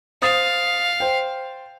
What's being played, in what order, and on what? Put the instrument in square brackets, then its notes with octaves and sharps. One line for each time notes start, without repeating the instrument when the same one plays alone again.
[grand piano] C5 D#6 A6 [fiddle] F5
[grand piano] C5 G5